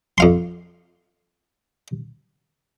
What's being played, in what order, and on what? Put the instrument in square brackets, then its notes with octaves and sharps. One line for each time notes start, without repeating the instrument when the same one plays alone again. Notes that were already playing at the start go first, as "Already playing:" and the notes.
[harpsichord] F2 F5 C6